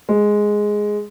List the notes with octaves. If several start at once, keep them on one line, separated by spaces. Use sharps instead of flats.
G#3